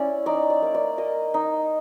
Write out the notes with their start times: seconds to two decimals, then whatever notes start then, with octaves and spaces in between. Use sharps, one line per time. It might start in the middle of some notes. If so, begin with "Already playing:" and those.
Already playing: C#4 E4 D5
0.26 D#4 D5
0.50 D5
0.62 A#3
0.74 D5
0.98 A#3 D#5
1.34 D#4